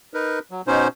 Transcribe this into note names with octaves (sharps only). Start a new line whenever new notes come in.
D#4 A#4 B4
F#3
B2 C#4 D#4 C5